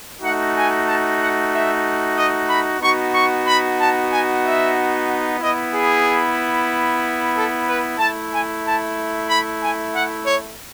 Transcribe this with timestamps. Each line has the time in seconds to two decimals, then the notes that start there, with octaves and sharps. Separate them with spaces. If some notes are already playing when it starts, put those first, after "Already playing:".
0.21 A3 D#4 F#4 F#5
0.54 G#5
0.86 A5
1.18 F#5
1.51 E5
2.16 D#5
2.48 B5
2.80 B3 D#4 F#4 C#6
3.13 C#6
3.45 B5
3.77 A5
4.10 G#5
4.43 E5
5.39 B3 E4 D#5
5.71 G#4
7.34 A4
7.66 B4
7.98 A3 E4 A5
8.31 G#5
8.63 A5
9.28 B5
9.60 G#5
9.93 F#5
10.24 C#5